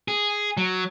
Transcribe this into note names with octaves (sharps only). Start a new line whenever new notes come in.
G#4
F#3